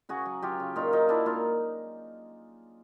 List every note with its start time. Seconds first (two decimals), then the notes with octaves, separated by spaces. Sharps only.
0.09 C#3 F#4 G#4
0.26 F#3
0.42 F#3 F4 G4
0.60 C#3
0.76 A#2 D#4 F4
0.92 F#3 D#4 F4
1.09 F#3 D4 E4
1.26 A#2 D#4 F4